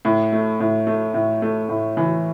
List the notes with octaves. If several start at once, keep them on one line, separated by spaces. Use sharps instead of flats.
A2
A3
A2
A3
A2
A3
A2
E3